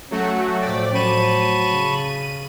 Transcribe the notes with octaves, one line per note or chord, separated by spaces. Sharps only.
F#3 A3 C#4 F#4
A2 F3 A3 D5 G5
F#3 A5 B5 C#6 D#7
C#3